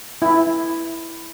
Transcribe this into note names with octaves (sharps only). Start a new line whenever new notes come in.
E4